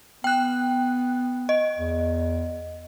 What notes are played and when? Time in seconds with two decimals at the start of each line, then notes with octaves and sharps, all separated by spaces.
0.24 B3 G5 F#6
1.49 D#5
1.79 E2